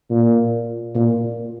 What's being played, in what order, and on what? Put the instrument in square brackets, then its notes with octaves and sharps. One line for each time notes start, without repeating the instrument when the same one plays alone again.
[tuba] A#2
A#2